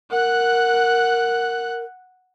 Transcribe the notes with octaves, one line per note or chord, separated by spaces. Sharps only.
A#4 F#5 F#6